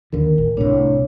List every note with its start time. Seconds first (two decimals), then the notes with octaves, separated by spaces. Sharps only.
0.13 D#2 D3 A#4
0.38 A1
0.57 C2 A2 D4 C#5